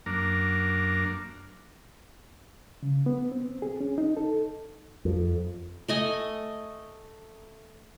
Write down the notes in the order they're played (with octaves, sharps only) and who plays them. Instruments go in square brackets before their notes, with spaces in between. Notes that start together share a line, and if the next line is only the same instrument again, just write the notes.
[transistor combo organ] F#2 A#3 D4 A#4
[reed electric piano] C#3
B3
C4
G#4
C#4
D#4
A4
[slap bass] F2
[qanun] A3 D#5 G#5